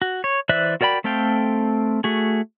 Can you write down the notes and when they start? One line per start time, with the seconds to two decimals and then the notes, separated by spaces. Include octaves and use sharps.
0.02 F#4
0.24 C#5
0.49 E3 C5 D5 E5 F#6
0.81 F#4 A#4 D5 G5 B5
1.04 A3 C4 A4 F5 G5
2.04 A3 F#4 G#4